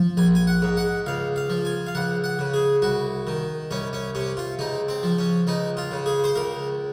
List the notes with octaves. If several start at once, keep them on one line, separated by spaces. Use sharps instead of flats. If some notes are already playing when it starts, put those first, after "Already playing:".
Already playing: F3
A#1 G#5
G#5
F#5
G#2
F#5
C#2 F5
F5
F3
G#5
F5
C#2 F#5
F#5
C#3
G#4
C2 F#4
D#3
C2 C#4
C#4
C3 C#4
F4
C#2 D#4
C4
F3
C#4
C#2 D#4
F4
C#3
G#4
C5
C#2 A#4